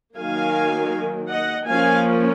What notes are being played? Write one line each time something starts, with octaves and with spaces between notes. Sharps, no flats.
D#3 F#3 A#3 F5 G#5
D#5 F#5
F3 A#3 C#4 F5 G#5